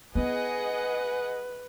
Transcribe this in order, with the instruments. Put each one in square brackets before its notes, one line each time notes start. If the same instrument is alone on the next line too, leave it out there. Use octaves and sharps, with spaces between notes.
[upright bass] B3 E4 [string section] G#4 D#5 F#5 [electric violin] B4